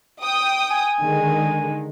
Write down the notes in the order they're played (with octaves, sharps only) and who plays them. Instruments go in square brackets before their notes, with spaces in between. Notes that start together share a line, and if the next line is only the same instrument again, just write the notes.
[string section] G5 D#6
[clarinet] G#5
[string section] D3 D#3 G#3